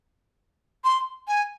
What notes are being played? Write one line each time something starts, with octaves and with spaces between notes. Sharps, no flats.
C6
G#5